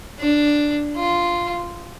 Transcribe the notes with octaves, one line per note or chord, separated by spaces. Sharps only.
D4
F4